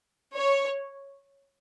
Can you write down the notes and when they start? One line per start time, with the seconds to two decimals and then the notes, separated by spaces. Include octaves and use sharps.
0.37 C#5